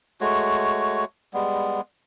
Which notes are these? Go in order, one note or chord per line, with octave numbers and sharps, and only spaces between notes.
G#3 A3 F#4 C#5
G3 G#3 B3